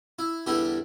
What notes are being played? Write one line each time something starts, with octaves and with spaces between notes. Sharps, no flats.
E4
E2 D3 G3 E4 G4